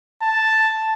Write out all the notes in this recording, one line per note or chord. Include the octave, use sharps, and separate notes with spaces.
A5